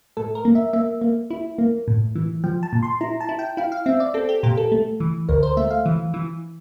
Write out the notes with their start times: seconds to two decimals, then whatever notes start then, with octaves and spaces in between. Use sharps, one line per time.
0.17 A2 A4
0.35 A#4
0.45 A#3
0.55 E5
0.73 A#3 E5
1.01 A#3
1.30 E4
1.58 A#3
1.88 A2
2.15 E3
2.44 F3 G5
2.63 A5
2.73 A#2
2.83 C6
3.01 E4 A#5
3.21 A5
3.29 E4
3.39 G5
3.57 E4 F5
3.72 F5
3.86 C4 E5
4.00 D5
4.14 C4 A4
4.29 G4
4.43 A#2 G4
4.57 A4
4.72 A3
5.00 E3
5.29 D2 A#4
5.43 C5
5.57 A3 E5
5.70 F5
5.86 E3
6.14 E3